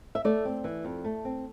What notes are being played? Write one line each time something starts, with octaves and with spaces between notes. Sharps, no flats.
E5
A3 D5
C4
E3
F2
A3
C4